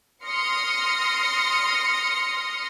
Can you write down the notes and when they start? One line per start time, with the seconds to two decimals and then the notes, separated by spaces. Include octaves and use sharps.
0.23 C6 D#6 F6 A#6 C#7